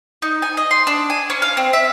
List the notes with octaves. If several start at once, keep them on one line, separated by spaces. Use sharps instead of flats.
D#4
G#5
D#5
C6
D4
G#5
C#4
F5
C4
E5